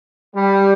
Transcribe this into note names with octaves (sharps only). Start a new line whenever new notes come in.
G3